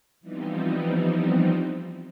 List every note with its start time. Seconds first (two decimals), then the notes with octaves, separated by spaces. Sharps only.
0.21 E3 F3 G3 B3 C4 D#4